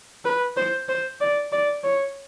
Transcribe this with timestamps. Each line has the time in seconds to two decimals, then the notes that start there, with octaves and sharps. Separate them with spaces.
0.25 B4
0.57 C5
0.89 C5
1.20 D5
1.52 D5
1.84 C#5